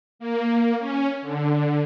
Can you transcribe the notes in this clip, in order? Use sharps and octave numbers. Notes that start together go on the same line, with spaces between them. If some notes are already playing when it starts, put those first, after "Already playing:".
A#3
C#4
D3